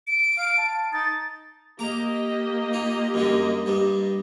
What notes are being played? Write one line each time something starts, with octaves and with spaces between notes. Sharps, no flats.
D7
F5
A5
D#4 A6
A#3 G4 D#5 A#5 D6
D#4 F4
F#2 D3 G3
G2 G3